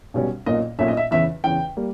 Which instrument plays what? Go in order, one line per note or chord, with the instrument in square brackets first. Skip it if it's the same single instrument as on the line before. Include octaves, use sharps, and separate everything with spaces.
[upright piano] B1 B2 G3 C#4
B1 A#2 A#3 C#4 D#5
B1 A#2 A#3 C#4 E5
D#5
E5
E2 C#3 E3 E5
E2 C#3 E3 G5
G3 A#3